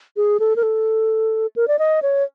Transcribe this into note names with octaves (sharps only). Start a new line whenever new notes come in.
G#4
A4
A#4
A4
A#4
D5
D#5
C#5